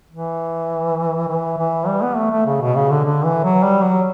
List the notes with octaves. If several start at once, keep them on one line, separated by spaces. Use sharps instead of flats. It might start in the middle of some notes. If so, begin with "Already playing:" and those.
E3
E3
E3
G3
B3
A3
A3
C#3
B2
C#3
D3
D3
E3
F#3
G3
F#3